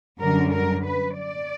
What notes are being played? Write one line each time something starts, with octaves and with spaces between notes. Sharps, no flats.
F#2 D3 G3 A#4
A#4
B4
D5